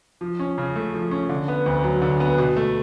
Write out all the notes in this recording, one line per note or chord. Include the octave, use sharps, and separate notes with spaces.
F3
C#4
C#3
A3
F3
C#4
D3
B3
D2
F#3
D3
B3
B2
A3